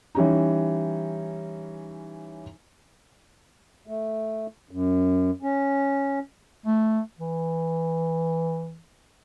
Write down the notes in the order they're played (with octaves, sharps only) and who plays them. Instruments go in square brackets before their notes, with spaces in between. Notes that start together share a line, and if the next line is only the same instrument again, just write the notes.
[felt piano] E3 G3 C#4 D#4
[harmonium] A3
F#2
C#4
[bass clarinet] A3
E3